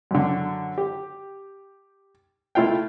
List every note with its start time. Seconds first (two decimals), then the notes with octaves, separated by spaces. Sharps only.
0.11 F#2 D3
0.78 G4
2.55 A3 E4 F4 F5 G5